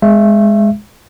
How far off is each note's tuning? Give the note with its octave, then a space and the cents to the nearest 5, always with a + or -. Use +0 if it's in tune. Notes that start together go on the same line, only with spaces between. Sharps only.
G#3 +0 E5 +25